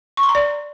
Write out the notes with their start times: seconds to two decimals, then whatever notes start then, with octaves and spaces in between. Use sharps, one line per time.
0.17 C#6
0.23 C6
0.29 A#5
0.35 D5